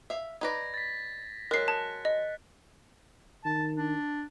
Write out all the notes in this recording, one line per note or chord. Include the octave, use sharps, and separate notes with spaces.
E5 F5
D#4 B4 D5 G#6 A#6
A6 B6
F#3 G#3 A#4 F#6 B6 C7
A5 B6 C#7
D#5
D#3 A5
D4